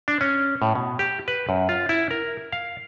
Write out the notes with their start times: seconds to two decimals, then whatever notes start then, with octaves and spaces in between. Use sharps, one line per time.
0.08 D4
0.21 C#4
0.62 A2
0.75 B2
0.99 G4
1.28 B4
1.49 F#2
1.69 F4
1.89 E4
2.11 A#4
2.52 F5